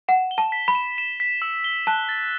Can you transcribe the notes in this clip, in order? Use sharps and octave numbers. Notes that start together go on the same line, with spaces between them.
F#5 E7
G7
A5
B6
B5
E7
E7
B6
E6
G7
A5 F#6
A6